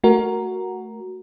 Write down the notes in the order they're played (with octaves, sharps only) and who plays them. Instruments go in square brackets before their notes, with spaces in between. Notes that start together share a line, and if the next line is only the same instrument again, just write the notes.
[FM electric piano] A3 F#4 A#4